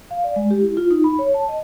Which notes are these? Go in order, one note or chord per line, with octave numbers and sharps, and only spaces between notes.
F5
D5
G#3
G4
E4
F4
D#4
B5
C#5
A5
D#5